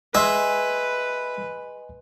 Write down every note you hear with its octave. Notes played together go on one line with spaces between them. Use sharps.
G#3 B4 D#5 E5 G#5 C6